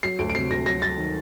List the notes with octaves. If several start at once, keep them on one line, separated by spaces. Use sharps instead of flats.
F#3 C7
D2 D7
D7
C3 C7
D2 A#6
F#3 A#6
F#3 A6
D#3